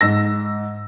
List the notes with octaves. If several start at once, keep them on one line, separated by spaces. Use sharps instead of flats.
G#2 E6 A#6